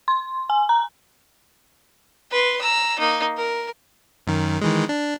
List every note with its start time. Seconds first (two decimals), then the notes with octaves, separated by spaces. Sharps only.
0.08 C6
0.50 G#5
0.69 A#5
2.31 B4 C6
2.61 A#5 E6
2.99 A#3 D#4
3.37 A#4
4.27 F#2 D#3
4.62 D#3 E3 G#3
4.89 D4